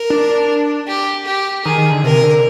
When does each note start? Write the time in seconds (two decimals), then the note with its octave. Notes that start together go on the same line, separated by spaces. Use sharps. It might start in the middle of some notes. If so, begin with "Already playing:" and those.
Already playing: A#4
0.10 D4
0.87 G4
1.26 G4
1.65 D#3 G#4
1.78 D#3
1.91 D3
2.03 C3 A#4
2.23 D3